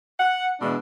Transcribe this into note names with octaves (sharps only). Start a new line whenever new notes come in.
F#5
B2 E3 G#3 D4